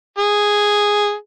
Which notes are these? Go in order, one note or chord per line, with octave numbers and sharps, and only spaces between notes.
G#4